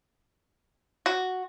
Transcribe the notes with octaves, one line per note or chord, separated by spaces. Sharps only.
F#4